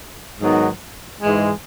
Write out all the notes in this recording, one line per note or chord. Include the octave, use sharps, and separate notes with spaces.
G#2 D#3 F#3 B3 D#4
G#2 E3 G#3